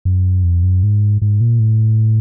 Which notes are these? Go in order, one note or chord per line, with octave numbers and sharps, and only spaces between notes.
F#2
F2
F#2
G#2
G#2
A#2
A2